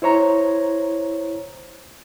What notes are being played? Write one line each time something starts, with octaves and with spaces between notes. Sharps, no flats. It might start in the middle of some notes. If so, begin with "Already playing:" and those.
E4 C5 C#5 A#5